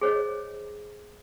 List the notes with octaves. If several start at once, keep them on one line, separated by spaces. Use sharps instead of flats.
G#4 C5 C#5 D#5